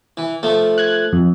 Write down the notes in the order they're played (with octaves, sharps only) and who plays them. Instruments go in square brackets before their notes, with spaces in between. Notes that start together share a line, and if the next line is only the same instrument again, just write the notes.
[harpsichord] E3
F3 A3
[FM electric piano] F#6 G#6
F2